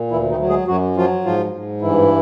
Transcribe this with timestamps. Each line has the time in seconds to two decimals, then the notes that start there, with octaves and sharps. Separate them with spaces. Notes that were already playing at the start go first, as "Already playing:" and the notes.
Already playing: A#2
0.11 D2 E3 E4
0.30 D#3 D#4
0.40 F#3
0.49 G#3 G#4
0.68 F#2 F#3 F#4
0.96 F3 F#3 F4
1.25 G#2 F3 F4
1.53 G#2
1.81 G2 E3 E4